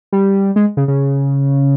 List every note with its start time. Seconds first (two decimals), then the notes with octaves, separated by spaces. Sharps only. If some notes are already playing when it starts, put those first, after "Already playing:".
0.12 G3
0.56 G#3
0.77 C#3
0.88 C#3